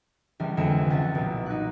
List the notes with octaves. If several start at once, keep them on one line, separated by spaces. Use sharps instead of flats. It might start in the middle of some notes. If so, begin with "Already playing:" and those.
C#2 E3 G3 F6
F2 D3 E3 G#3 C#7 E7
C2
C#2 F#5 A6
B1 A#2
D#4 F#6